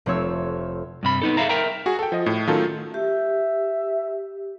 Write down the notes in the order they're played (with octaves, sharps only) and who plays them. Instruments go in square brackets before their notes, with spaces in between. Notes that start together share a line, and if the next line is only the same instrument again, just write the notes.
[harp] F1 A3 C4 F4 C#5 E6
[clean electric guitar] G2 C3 B5
B3 D#4 A4
G#4 A4 C#5 E5 F5 A#5
A#4 E5 G5 A#5
[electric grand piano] F#4 G#4
A4 G5
F3 D#5
A2
D#3 F#3 A3 C#4 F4 A4
[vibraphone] G4 [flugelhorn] E5